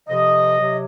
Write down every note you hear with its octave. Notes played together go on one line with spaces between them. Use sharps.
F2 C3 F3 D#5
C3 F#3